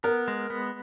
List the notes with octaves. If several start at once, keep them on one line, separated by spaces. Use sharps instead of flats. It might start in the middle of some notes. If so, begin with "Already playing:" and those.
B3 A#4
G#3
B3